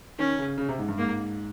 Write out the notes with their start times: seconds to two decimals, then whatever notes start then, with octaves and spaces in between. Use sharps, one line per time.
0.19 D#3 C#4
0.38 C#3
0.58 C#3
0.69 C3
0.79 G#2
0.88 G2
0.98 G#2 A#3